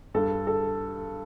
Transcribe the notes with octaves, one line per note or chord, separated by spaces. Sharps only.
G2 A4
A4